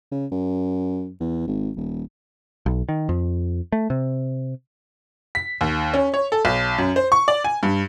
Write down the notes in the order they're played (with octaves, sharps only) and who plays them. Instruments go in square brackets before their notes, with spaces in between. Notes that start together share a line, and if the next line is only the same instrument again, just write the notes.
[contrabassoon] C#3
F#2
E2
G#1
D#1
[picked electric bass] B1
D#3
F2
A3
C3
[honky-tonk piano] B6
D#2
C#4
C#5
A4
B1
F#2
C5
C#6
D5
G#5
G2